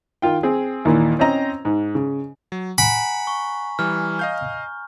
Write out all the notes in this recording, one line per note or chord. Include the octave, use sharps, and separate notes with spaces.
D#3 F4 G5
C4 G#4
D#2 A#2 E3
C4 C#4 C5 D#5 A#5
G#2
C#3
F#3
F#5 G#5 A#5 B5
C#6
E3 G3 F6
D#5 F5 G6